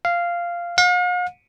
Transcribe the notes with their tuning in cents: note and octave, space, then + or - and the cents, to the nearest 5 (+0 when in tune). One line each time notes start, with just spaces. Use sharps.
F5 -10
F5 +45